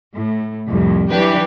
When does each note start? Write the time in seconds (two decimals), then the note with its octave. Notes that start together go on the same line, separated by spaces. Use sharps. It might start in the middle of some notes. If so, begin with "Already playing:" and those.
0.14 A2
0.68 C2 F2 A2
1.11 E3 F#3 D4 G4 B4